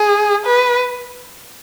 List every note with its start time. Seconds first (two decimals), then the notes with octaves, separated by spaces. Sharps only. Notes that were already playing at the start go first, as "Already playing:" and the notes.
Already playing: G#4
0.46 B4